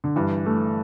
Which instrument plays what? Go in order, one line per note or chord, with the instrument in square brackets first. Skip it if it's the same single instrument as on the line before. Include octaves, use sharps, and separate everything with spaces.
[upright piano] D3
[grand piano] G2 [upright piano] E3
[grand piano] A3